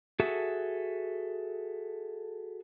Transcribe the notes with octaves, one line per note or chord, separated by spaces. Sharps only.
F#4 G#4 A4 E5